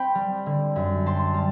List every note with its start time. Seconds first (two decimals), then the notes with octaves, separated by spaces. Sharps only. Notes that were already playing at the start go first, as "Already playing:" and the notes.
Already playing: C4 G5 B5
0.15 G3
0.46 D3
0.76 F#2
1.06 C4 A5 C6
1.34 G3 A5